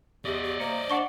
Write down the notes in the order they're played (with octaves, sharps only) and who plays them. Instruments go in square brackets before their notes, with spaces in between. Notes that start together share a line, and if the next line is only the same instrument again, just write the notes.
[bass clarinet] E2 [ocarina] G4 [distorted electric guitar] D5 D#5
[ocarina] G4
[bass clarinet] A#3 [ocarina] C5 [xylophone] C#7
[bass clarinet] D4 [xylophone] F#5 C#6 G7